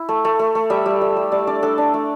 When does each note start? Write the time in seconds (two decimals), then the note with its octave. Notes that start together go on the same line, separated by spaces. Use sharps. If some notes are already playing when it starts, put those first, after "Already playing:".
Already playing: E4
0.09 A3
0.25 A3
0.39 A3
0.55 A3
0.70 G3 E5
0.86 G3
1.01 G3
1.16 G3
1.31 G3 D5
1.47 D4 D5
1.63 D4 A4
1.78 D4
1.94 A3